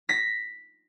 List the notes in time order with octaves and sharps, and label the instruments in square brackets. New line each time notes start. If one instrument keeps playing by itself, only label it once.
[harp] A#6 B6